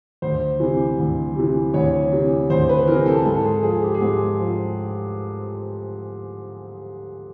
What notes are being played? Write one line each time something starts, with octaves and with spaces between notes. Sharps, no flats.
D2 C5
C3 E3
D2
C3 E3
D2 C#5
C3 E3
D2 C5
B4
C3 E3 A#4
A4
G#2 A4
G#4
F3 G#4
G4
G#4
G#2 G4
F3